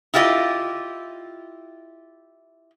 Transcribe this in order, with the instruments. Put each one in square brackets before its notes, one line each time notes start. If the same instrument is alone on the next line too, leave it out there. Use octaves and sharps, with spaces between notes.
[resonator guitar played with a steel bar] E4 F4 G4 A#4 D#5